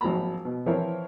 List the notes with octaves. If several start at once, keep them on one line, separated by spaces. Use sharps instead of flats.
G#1 F3 F#3 A#3 A#5 B5
B2
E3 F3 C4 E4 A#4 C#5